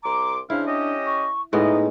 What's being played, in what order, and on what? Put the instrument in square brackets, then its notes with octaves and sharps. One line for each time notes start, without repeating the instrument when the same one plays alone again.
[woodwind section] C2 C6 D6 [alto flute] A#5
[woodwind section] C#3 C5 F5 [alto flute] D4 [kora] E4
[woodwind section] C#4 G4 D#5
[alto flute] C#6
[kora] A2 G#3 B3 [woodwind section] E3 G3 D#5 [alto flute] D#4